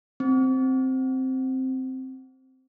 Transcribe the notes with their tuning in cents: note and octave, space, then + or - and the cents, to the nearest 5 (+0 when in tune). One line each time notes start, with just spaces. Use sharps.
C4 +0